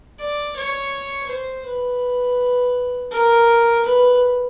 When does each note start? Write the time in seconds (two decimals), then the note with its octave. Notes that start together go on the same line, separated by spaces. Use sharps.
0.19 D5
0.56 C#5
1.29 C5
1.66 B4
3.12 A#4
3.84 B4